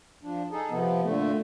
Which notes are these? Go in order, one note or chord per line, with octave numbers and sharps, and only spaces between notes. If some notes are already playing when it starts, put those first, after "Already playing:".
F3 D4
D#4 G#4 A4
C3 F3 B3
A#2 D3 A3